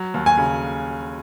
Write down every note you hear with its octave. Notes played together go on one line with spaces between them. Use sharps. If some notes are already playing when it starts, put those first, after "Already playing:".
Already playing: F#3
D#2
G#5
C#3